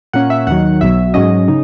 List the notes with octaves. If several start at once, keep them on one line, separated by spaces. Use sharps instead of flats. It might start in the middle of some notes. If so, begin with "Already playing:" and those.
A#2 A#3 C#4 F#5
E5
D#2 D#3 F#3 F#5
B1 B2 F#3 E5
G#2 F#3 C#4 D#5
C#3 D#4